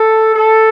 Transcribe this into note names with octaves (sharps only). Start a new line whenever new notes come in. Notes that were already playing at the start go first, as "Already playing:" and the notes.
Already playing: A4
A4